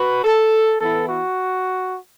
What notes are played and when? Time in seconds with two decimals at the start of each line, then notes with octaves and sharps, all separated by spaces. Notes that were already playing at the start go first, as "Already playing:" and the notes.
Already playing: F#4 B4
0.24 A4
0.80 E3 B3 E4 A4
1.09 F#4